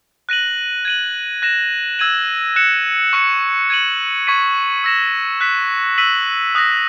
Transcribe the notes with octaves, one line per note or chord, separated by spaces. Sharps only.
F#6 A#6 D#7 F#7
G#6 D#7 F#7
F#6 A#6 E7
E6 G#6 D#7 F#7
F#6 C#7 E7
C#6 F#6 C#7
G#6 D#7 F#7
C#6 G#6 B6 D#7
E6 A#6 E7
F#6 B6 E7
E6 B6 D#7 F#7
D#6 F#6 A#6